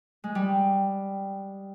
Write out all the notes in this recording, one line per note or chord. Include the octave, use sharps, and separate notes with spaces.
G#3
G3